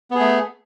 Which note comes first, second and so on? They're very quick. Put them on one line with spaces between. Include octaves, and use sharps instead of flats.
B3 G#4 A3